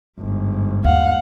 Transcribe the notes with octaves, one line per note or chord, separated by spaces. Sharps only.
G1 G#2
D#2 F5 F#5